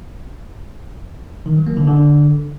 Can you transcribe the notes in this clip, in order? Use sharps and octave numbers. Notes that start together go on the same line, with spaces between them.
D#3
F#3
A#3
D3
D3